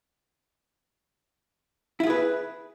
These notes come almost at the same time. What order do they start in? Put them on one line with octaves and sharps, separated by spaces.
E4 F4 G#4 B4